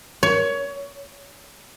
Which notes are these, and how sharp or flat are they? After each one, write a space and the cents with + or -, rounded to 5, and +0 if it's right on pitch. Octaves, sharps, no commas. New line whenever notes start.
C#5 +20